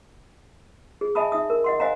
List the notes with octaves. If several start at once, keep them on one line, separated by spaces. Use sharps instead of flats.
G#4
D#5 E5 G#5 A5 B5 D#6
D#4 E5 D#6
A#4
D#5 F#5 C6
C5 D#5 F5 F#5 G#5 A#5